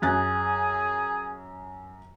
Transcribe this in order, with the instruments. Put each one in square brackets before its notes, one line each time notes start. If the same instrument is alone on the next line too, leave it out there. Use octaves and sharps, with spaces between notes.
[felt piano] F#2 F#6 A6 [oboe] G#4